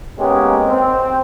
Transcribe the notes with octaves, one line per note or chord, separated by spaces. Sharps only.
G#3 A#3 B3 C#4 D#4 G4
C4